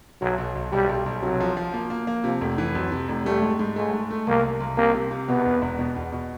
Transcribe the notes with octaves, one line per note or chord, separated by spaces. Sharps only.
B1 F#3
B1
B1
B1 G3
B1
B1
C3 F#3
F3
F3
A#3
A#3
A#3
C3 F3
F1
E3
F2 F#3
C3
F1
G3 A3
G#2
G#2
G#3 A3
G#2
A3
C2 A#3
C2
C2
C3 A#3
C3
C3
B2 B3
E2
E1
B2
E2
B2